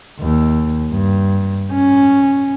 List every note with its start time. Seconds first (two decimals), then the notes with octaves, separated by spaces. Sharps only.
0.20 D#2
0.92 G2
1.73 C#4